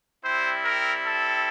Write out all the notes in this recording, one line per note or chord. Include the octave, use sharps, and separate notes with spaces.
G3 C4 E4 C5
A#4
A4